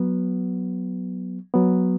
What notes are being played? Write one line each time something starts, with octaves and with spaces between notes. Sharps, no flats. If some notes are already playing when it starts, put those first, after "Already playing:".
Already playing: F#3 B3
F#3 B3